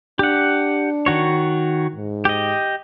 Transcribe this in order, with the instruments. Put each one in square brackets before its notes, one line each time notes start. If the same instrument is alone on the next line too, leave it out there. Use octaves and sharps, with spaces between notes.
[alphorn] D4 [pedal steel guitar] G4 F#5
[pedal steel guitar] D#3 F#4 C#5
[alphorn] G#2
[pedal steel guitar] G4 D#5